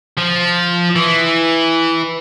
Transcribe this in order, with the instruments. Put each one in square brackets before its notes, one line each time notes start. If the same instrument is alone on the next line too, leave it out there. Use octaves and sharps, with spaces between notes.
[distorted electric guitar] F3
E3